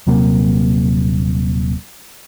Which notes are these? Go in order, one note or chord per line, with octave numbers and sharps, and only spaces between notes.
D#1 C3 F#3 A#3